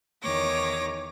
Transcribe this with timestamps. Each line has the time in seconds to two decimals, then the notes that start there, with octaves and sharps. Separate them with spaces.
0.22 E2 D#3 C#5 D6 A#6